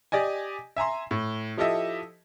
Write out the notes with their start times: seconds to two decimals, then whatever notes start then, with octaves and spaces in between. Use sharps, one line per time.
0.12 G4 D5 D#5 G#5
0.77 E5 G#5 A#5 C6
1.11 A2
1.57 F3 E4 G4 A4 D#5 E5